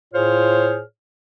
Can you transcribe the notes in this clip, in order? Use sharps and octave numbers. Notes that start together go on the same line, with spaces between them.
A2 F4 G#4 C5 C#5 F6